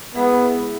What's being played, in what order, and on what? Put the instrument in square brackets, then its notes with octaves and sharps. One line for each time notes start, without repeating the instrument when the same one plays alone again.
[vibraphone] G#3 E4 G#4 B4 E5 [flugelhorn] B3